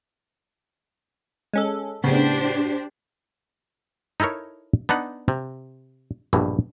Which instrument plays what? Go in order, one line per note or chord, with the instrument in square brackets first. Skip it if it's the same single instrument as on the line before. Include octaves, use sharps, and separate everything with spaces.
[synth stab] G#3 C#4 A4
[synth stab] A2 C#3 B3 [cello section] D4 G4 C5
[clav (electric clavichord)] D#4 E4 A4 A#4 C#5
B3 D4 D#4 F#5
C3
A#1 G2 B2 E3